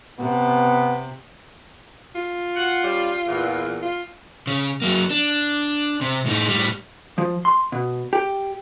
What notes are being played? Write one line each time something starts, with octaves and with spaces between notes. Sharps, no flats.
C3 B3
F4
F#5
G3 C#4
E2 A#2
F4
C#3
F#3 A#3
D4
C3
A2 D#4
A2 G3
F3
C6
B2
G4